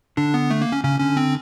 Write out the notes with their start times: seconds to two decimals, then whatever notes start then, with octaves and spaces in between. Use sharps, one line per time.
0.17 D3 D4
0.34 B3
0.51 A3
0.62 A#3
0.72 C#4
0.84 C#3 C#4
1.00 D3 C#4
1.17 C4